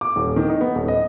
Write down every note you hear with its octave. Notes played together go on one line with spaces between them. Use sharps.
D6
D#1
D#3
D#4
B3
D#1
D#5